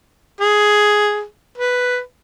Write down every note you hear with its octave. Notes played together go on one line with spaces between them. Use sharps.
G#4
B4